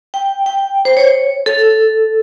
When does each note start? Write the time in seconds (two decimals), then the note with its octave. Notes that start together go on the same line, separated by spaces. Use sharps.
0.14 G5
0.46 G5
0.85 C5
0.97 C#5
1.46 A4